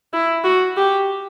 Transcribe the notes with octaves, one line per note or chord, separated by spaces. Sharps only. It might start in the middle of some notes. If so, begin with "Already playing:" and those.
E4
F#4
G4